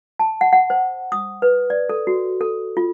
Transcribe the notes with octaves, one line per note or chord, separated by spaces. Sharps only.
A5
F#5
F#5
C5
D#6
B4
D5
A4
F#4
A4
F4